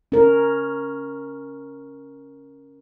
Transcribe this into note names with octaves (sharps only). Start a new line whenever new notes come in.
C#4 A#4